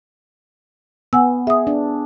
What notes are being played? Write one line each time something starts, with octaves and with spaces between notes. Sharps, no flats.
B3 F#5 G#5 E6
G#4 E5 D#6
D4